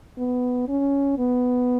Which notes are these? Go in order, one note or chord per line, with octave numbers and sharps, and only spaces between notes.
B3
C#4
B3